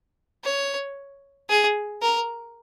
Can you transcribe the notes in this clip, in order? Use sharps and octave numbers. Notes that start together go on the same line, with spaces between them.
C#5
G#4
A#4